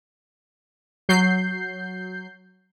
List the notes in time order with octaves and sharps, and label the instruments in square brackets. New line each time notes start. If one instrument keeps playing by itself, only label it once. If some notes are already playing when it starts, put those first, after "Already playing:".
[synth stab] F#3 G6 C7